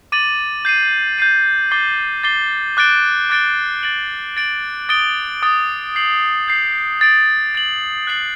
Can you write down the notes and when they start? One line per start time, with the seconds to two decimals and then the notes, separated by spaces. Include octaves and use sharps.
0.12 D6 A6 D#7 F#7
0.65 G6 C7 D#7
1.19 G6 C7 D#7
1.71 D6 A6 C7 G7
2.23 D6 A6 C7 G7
2.77 D6 F#6 A6 D7 G7
3.30 D6 F#6 A6 D7 G7
3.83 A6 D7 F#7
4.37 A6 D7 F#7
4.89 D#6 A6 D7 G7
5.42 D#6 A6 D7 G7
5.95 G6 C7 F#7
6.48 G6 C7 F#7
7.01 A6 D7 F#7
7.55 A6 D7 F#7
8.07 F#6 A6 C7 F#7